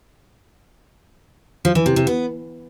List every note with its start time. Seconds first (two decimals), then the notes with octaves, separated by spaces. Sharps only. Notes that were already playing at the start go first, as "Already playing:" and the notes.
1.65 F3
1.75 E3
1.86 C3
1.96 C3
2.07 B3